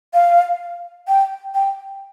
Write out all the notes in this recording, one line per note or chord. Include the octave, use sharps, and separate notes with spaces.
F5
G5
G5